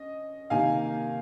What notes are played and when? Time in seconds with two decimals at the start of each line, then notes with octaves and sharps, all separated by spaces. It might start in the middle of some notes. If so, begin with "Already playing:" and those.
Already playing: C#4 D#5
0.50 C3 D#3 A#3 F5 G#5